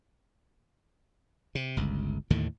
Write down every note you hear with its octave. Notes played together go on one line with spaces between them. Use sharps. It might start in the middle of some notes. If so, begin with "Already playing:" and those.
C3
G1 C#2
D#2 A2 D3 D#3